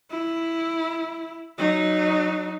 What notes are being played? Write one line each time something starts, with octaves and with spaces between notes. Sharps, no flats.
E4
F#3 D#4